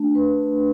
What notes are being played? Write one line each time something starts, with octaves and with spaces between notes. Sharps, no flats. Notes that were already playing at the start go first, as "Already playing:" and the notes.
Already playing: A3 D4
B4